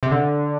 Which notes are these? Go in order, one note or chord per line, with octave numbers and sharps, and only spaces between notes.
C3
D3